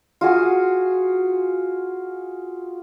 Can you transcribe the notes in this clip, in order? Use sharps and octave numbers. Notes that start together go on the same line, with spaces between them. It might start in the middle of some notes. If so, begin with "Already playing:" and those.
F4 F#4 G#4